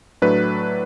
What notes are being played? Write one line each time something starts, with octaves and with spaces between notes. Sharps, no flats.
A2 F#3 A3 D4 B4